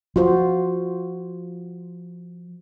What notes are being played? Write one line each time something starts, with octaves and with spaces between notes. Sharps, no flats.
F3 F4 F#4 C5